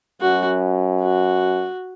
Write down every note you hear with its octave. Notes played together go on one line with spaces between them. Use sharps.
F#2 F#4
F#4